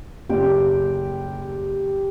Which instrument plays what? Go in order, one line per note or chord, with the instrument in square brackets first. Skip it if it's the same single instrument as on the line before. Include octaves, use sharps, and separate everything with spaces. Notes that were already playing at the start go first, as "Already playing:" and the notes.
[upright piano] F#1 [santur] G4